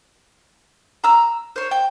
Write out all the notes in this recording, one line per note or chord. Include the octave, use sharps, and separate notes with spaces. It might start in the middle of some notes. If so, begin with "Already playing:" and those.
A#5 E6
C5 C#5
G5